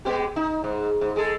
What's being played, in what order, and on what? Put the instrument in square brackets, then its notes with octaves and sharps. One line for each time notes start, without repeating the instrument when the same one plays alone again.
[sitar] G#3 B3 G4
D#4
G#2
G#2
G#3 G#4 A4